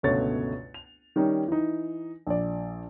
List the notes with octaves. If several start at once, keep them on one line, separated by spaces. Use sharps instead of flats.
G1 C#2 B2 A3 C#5 A6
F7
D#3 G3 C#4 D#4
E3 D#4
A#1 D5